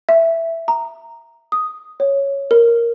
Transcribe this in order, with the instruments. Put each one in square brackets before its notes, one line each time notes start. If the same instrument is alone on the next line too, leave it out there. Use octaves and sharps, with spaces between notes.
[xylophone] E5
A#5
D#6
C#5
A#4